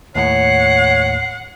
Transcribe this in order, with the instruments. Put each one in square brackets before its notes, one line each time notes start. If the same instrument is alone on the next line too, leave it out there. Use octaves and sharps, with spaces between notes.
[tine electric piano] D#2 A2 [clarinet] C#5 [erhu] F#5 [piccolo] C7